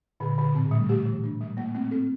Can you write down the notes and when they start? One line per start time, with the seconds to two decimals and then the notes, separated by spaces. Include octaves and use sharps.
0.20 A#2 D3
0.38 D3
0.54 A2 C4
0.66 A#2
0.71 G3
0.78 A3
0.89 A3 G4
1.05 E3
1.23 D4
1.41 G3
1.57 A3 A#3
1.75 A3 C4
1.91 C4 A4